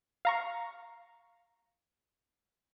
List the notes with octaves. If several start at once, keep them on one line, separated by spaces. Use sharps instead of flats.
F5 A#5 C#6